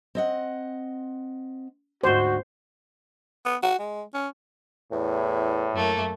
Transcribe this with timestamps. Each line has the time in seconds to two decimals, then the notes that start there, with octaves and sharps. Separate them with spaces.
0.15 C4 D#5 F#5
2.04 D2 G#2 F#4 C5
3.45 B3
3.63 F#4
3.79 G#3
4.14 C#4
4.92 E2 A2
5.72 F#2 A3 A#3